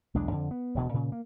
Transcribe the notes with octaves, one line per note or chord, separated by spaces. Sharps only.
B1 E2 G#3 D4
F2 D3
B3
E1 A1 D2 B2
A#2 C#3
A#3